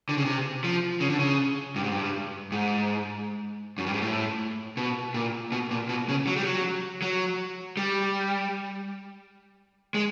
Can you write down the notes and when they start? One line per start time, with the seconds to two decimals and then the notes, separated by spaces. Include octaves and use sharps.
0.09 D3
0.17 C#3
0.25 C3
0.64 F3
1.00 C#3
1.10 D3
1.19 C#3
1.76 G2
1.84 G#2
1.92 G2
2.52 G#2
3.78 F#2
3.86 G2
3.94 G#2
4.02 A2
4.77 B2
5.14 A#2
5.52 B2
5.71 A#2
5.89 B2
6.09 C#3
6.27 F#3
6.36 G3
6.44 F#3
7.02 F#3
7.77 G3
9.94 G#3